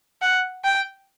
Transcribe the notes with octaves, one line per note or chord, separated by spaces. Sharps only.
F#5
G5